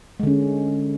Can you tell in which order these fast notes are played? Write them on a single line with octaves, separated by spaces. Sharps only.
G#3 D3 C#4